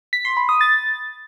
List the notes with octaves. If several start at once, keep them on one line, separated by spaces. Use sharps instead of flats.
B6
C6
B5
D#6
A6